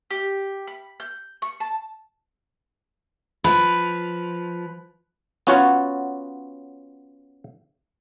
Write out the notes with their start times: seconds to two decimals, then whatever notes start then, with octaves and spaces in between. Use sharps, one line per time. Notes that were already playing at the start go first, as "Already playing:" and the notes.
0.10 G4
0.67 B5
1.00 G6
1.42 C#6
1.60 A5
3.44 F3 B4
5.47 B3 C#4 F4 F#4 C#5 F#5